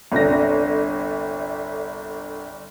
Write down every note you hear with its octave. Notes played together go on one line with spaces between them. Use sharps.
G1 C2 D3 A#6